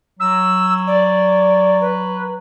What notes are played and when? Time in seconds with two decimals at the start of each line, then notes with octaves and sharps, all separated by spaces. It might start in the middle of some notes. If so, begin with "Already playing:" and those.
0.19 F#3 E6
0.87 D5
1.80 B4